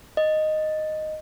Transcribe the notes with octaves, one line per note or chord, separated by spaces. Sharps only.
D#5